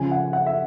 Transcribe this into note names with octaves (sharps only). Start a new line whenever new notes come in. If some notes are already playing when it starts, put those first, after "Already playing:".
Already playing: C#2 C#3 F3 G#5
F#5
F#5
E5